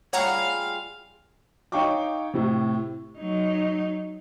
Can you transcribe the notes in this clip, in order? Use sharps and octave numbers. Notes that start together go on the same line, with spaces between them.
G3 F4 G#4 C#5 F5 F#5 A#5
D#4 C#5 F5 G5 C#6 D6
A2 C3
F#3 D#4